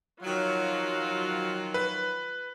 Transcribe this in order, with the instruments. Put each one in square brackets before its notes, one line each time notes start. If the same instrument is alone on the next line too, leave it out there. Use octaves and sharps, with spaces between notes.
[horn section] D#3 F3 F#3 [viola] F4
[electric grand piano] B4